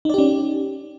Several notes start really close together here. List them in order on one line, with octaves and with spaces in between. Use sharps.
D#4 D5 G4 C#4